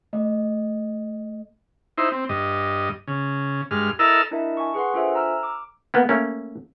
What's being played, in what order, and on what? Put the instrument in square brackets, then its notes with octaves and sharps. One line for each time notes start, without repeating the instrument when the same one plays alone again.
[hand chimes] A3 D#5
[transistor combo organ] D#4 E4 C5
C4
G2 D#5
C#3
G2 G#3 F6
E4 A4 A#4 D#5 E6 F6
[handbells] D4 E4 A#4 D#5 E5 A5
G#5 C#6
G#4 B4 F#5 C6
D4 F4 A4 C5 E5 G#5
A#5 E6 F6
D6
[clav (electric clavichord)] A#3 B3
A3 A#3 C#4